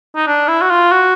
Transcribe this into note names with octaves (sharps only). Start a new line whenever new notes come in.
D#4
D4
E4
F#4
F4
F#4